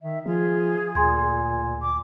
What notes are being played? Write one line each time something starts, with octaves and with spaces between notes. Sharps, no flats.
D#3 E5
F3 F4 G#4
D2 A#2 G#5 C6 G#6
D6